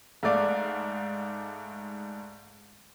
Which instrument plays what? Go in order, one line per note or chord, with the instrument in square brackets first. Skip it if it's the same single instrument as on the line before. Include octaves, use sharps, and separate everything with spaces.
[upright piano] G#2 A3 D5 F5